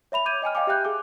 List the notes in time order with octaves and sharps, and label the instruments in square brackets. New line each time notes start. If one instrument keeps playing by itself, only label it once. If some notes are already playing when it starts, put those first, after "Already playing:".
[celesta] C#5 E5 B5 F7
D6 G6 G#6 D#7
D#5 G5 G#5 F6
D#5 F5 G5 G#5 D6
G4 E5 G5 F#6 G6
G#4 D6